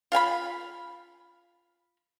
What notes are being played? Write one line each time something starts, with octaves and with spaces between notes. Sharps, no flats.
F4 F5 G#5 B5